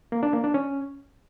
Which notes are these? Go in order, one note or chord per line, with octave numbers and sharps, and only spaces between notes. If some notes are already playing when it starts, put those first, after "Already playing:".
A#3
D4
A#3
D4
C#4